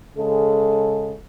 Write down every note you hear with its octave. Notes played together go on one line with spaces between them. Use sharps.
C#3 G#3 A4